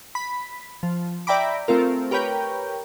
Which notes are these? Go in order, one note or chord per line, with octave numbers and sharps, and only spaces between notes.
B5
F3
D5 E5 G5 A#5 B5 D6
A3 C4 F4 A#4
G4 A#4 B4 C#5 G5